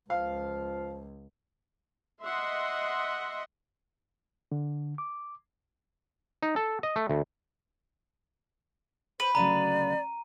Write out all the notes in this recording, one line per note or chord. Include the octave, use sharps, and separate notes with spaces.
C#2 F3 F5
D#5 E5 F#5 C6
D3
D6
D#4
A4
D#5
A3
D2
B4 C5
D2 C#3 F#3 D5 A#5 D#7